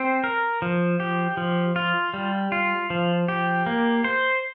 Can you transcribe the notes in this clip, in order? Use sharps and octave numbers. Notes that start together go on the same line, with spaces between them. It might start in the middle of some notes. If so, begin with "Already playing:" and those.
Already playing: C4 C5
A#4
F3
G4
F3
F4
G3
F4
F3
G4
A#3
C5